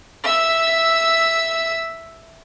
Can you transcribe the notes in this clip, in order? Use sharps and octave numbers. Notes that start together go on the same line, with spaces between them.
E5 E6